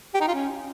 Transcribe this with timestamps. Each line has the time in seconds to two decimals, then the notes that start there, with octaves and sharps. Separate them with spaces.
0.14 G4
0.21 D#4
0.27 F4
0.34 C#4